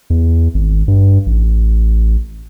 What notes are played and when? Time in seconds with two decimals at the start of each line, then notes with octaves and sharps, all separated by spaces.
0.10 E2
0.54 G#1
0.88 G2
1.26 A1